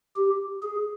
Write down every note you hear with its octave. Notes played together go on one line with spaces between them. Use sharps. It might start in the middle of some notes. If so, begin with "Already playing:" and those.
G4
G#4